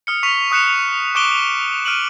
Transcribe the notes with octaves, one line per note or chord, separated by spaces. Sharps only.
D#6 F6 C#7
C#6 B6 F7
C#6 D#6 F#6 C#7 E7
C#6 D6 F#6 D7 E7 G7
F6 D7 D#7 F#7